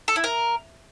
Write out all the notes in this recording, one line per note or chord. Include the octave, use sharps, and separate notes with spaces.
A4
E4
A#4